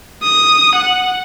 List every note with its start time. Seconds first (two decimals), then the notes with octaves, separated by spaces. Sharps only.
0.23 D#6
0.75 F#5